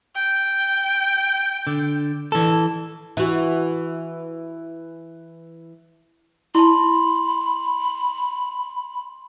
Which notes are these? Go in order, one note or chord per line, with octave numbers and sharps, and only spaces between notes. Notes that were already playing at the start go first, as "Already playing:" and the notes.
G5
D3
E3 A4
E3 F#4
E4 A5 B5 C6